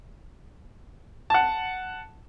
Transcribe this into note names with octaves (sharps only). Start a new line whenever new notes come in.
F#5 A5